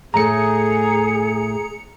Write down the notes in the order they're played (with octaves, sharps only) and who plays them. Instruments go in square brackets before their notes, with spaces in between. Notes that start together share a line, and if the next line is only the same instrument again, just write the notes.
[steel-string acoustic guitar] A2 A3 [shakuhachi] G#4 [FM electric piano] A#5 C#7